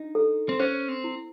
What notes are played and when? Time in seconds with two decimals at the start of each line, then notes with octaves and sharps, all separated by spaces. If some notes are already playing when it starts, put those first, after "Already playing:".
Already playing: D4 D#4
0.15 A4
0.49 C4
0.59 C#4 C5
0.89 C4
1.04 E4